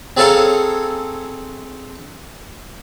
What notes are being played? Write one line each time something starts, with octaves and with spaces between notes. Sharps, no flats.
C4 G#4 A4 C#5 F5 A#5